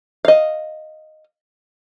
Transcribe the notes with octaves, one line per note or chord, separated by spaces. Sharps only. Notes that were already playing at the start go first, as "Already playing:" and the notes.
D#5 F5